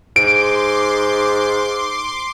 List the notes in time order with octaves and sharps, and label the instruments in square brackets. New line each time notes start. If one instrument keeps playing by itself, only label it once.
[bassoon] G#2 [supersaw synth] C6 D6 [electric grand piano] D7